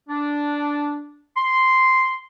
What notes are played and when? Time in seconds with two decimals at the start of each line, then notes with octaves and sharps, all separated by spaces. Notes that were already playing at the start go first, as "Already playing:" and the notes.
0.09 D4
1.37 C6